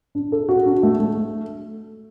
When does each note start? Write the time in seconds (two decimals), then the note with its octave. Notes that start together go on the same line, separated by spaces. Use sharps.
0.15 D4
0.32 A4
0.49 F#4
0.66 D4
0.83 A3
1.00 A3